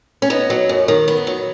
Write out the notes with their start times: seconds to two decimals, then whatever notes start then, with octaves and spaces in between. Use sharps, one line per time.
0.22 C#4
0.30 B3 D#4
0.50 F#3
0.69 F#2
0.88 D#3
1.08 B3
1.27 F#3